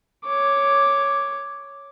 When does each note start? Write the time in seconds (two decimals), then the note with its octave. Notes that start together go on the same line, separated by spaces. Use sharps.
0.25 C#5 D6